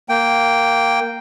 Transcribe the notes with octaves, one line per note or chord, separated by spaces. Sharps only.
A#3 G5